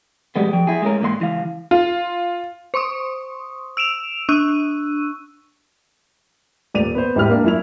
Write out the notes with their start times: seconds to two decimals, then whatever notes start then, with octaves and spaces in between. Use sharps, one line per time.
0.36 F2 B2 G3 G#3 B3
0.53 F2 F3 G5
0.67 E4 G#4
0.82 G#3 A3 C#4 A#4
1.01 G#2 E3 A#3 D#5 C6
1.19 C#2 E3 F5
1.71 F4
2.74 C5 C6 C#6 D#6
3.77 E6 D7 E7 F7
4.29 D4 C#6 E6 F#6 D#7
6.74 D#1 D5 D#7 F7
6.95 B3 C5
7.15 E1 A2 G3 G4 F6
7.29 A#3 D4
7.44 F#2 E4 F7